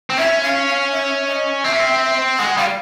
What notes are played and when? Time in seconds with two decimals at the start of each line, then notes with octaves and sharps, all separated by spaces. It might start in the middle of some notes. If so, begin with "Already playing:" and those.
0.10 C4
0.17 C#4 E5
0.42 F5
0.66 F5
0.91 E5
1.28 D#5
1.64 C4 E5
1.72 C#4
1.80 C4
2.38 G#3 F#5
2.57 G3 F5